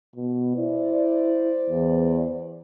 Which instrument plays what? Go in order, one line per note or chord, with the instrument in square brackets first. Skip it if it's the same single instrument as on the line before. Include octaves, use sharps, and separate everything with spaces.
[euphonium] B2
[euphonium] E4 [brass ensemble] C5 D5
[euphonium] E2